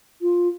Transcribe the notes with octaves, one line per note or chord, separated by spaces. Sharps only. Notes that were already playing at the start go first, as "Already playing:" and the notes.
F4